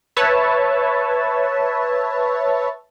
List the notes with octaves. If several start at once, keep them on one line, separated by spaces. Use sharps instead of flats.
B4 C#5 E5 A5